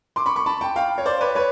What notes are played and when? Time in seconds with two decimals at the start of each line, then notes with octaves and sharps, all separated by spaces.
0.16 C6 D6
0.26 B5 C#6
0.36 B5 C#6
0.46 A5 B5
0.61 G5 A5
0.76 F5 G5
0.98 C#5
1.06 C5 D5
1.21 B4 C#5
1.35 B4 C#5